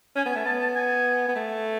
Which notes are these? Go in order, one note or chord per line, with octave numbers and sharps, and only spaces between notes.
C#4 G#5
B3
G#5
A3
B3 A5
A5
G#5
B3
A3